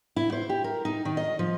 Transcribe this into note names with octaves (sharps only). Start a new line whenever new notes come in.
E4
C5
G4
A#4
D#4
D#3
D#5
F3